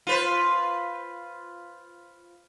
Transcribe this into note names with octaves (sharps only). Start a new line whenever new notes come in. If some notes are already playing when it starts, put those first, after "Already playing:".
F4 B4 C5